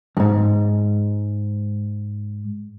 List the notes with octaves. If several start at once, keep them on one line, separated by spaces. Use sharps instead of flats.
F2 G#2